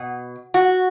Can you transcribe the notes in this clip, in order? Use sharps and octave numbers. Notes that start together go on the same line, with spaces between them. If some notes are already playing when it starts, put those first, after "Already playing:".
Already playing: B2
F#4